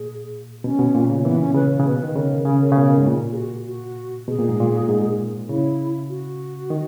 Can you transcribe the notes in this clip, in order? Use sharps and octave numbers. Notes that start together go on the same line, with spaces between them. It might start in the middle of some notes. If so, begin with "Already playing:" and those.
Already playing: A#2 G#4
B2 C#4
B2
A#2
C#3
E3 B3
C#4
C#3 B4
C#3
B2 B4
D#3
C#3 A#4
C#3 G#4
A#4
C#3 G#4
B2 A#4
A#4
G#2
A#2
G#4
F#4
F#4
B2 G#4
A#2
G#2
A#2
G#2
C#3 E4
F#4
D#3